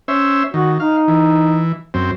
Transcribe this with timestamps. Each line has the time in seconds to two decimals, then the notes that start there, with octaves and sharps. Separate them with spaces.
0.08 C#4 C5 E5
0.54 D#3 F#4
0.80 D#4 F5
1.08 E3
1.94 F#2 C4